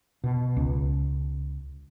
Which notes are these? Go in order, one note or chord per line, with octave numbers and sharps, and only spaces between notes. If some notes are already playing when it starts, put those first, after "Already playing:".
B2
C#2